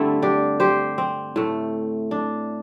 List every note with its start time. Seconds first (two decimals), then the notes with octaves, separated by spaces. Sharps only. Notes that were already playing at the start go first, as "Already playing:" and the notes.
Already playing: G2 D3 A3 C4 E4
0.22 D4 G4
0.60 G4 C5
0.98 C4
1.36 A2 A3
2.11 D4